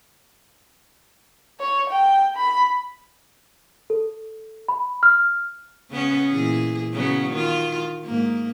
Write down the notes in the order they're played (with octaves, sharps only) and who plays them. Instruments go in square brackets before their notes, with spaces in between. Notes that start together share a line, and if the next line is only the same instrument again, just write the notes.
[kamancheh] C#5
G5
B5
[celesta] A4
B5
F6
[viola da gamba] C#3 B3 C#4
A#2 E3 G#4
C#3 F#3 B3
D#3 F4
G#2 A#3